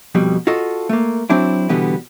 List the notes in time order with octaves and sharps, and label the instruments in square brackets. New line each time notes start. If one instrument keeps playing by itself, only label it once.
[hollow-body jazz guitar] F2 B2 G3
F4 F#4 A4 D#5
A3 A#3
F#3 C4 D4 E4
B2 D3 E3 G3 B3